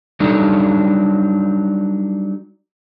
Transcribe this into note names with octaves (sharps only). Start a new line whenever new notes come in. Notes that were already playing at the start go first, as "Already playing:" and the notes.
F#3 G3 D4 D#4 A4